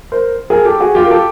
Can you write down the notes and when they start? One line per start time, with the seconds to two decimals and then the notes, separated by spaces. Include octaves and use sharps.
0.12 A#4 C5
0.50 G#4 A#4
0.65 G4 A4
0.80 F#4 G#4
0.95 F4 G4
1.06 A#4
1.11 G4 A4